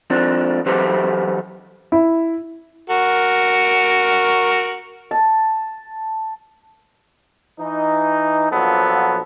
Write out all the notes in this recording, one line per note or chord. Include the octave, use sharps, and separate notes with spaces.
F3 C4 D4
E3 F#3 G4 A4 B4 C5
E4
F#4 A#4
A5
E3 D#4
A#1 F3 F#3 B3 A4